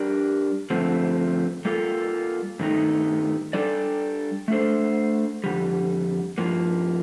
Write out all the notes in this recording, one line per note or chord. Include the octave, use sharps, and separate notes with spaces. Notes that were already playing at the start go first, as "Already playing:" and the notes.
Already playing: G3 D4 G4 A#4 D5
G2 D3 F3 A3 C4
G3 A#3 F4 A4
G2 D#3 A3 D#4
G3 D4 A4 D5
A3 D4 A4 C5
F2 D3 G3
G2 F3 A#3